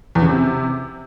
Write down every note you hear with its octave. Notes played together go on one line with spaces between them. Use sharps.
E2
C#3
C3